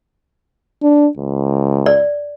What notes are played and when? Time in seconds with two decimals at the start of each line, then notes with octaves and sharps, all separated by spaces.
0.82 D4
1.17 C#2
1.86 D5